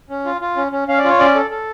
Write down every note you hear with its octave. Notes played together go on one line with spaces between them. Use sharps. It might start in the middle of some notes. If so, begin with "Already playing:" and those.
C#4
F4
F4
C#4
C#4
C#4 F5
D5
F4 C#5
C#4 D5
A4
A4